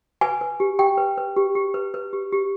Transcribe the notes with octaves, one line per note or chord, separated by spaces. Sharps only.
B4 G#5
B4
G4
G4 G5
B4
B4
G4
G4
B4
B4
G4
G4